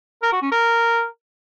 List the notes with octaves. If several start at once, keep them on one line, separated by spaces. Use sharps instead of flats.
A#4
F#4
C#4
A#4